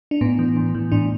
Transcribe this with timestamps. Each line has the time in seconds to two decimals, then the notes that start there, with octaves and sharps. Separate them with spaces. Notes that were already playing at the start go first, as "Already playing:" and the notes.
0.11 D4
0.21 A2 B3
0.39 E3
0.56 A2
0.75 E3
0.92 A2 D4